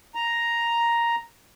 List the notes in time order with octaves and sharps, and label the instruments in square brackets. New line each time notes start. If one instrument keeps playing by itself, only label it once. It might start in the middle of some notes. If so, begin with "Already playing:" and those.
[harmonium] A#5